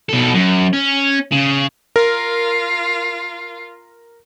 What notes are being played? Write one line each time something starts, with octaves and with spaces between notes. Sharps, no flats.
B2 A4
F#2
C#4
C#3
F4 A#4